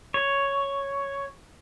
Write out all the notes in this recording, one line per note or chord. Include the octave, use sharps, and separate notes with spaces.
C#5